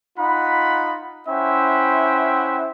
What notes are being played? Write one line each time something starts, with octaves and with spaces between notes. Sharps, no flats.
D#4 F4 F#5 B5
C#4 E4 C5 E5 F#5 G5